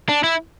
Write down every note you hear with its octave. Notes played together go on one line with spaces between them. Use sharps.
D4
E4